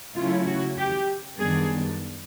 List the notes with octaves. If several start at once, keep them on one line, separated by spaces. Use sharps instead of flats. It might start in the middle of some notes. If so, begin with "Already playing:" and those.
C#3 F#3 A3 C#4 E4 F4
F#4
G4
F#2 D#3 G3 B3 D4 G#4